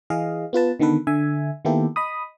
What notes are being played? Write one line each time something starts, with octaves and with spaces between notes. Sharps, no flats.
E3 G#4 D#5 F5
B3 F4 B4 A5
D3 D#3 B3 A4 B4
D3 E5 G#5
D#3 A#3 B3 E4 G4 A4
D#5 B5 D#6